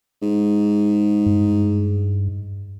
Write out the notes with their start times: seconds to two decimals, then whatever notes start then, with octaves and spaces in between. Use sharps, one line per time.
0.22 G#2
1.26 G2